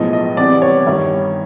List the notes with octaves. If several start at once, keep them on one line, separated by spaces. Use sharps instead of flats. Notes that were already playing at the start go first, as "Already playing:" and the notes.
Already playing: B1 A2 F3 G#3 B3 D#5
D#5
E2 C3 E3 G3 B3 D5
C#5
G2 D#3 G3